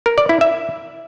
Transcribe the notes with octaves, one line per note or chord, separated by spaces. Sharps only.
A#4
D5
E4
E5